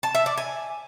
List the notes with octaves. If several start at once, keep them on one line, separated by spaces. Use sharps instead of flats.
A5
E5
D5
G#5